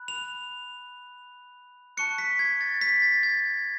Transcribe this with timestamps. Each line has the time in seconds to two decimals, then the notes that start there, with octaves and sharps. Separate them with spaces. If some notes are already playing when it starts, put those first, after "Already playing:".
Already playing: B5 F#6
0.08 F7
1.97 A5 C#6 F#6 C#7
2.18 B6
2.39 G#6
2.61 A6
2.81 B6
3.02 A6
3.23 G#6